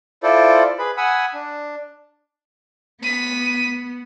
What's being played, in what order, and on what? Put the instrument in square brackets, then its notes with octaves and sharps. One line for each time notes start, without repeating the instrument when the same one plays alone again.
[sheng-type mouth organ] E4 F4 A4 C5 D5
G#4 B4 B5
F#5 G#5 B5 D#6 E6
D4
[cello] B3 [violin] B6 D#7